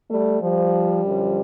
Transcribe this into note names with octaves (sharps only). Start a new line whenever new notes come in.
G3 A3
F3 G3
F#2 D3 F3